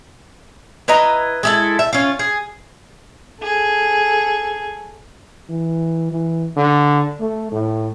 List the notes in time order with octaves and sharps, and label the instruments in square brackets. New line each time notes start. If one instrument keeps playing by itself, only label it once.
[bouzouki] E4 B4 D#5 A#5
G#3 E4 A4
E5
C#4 F4
G#4
[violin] G#4 A4
[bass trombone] E3
E3
D3
A3
A2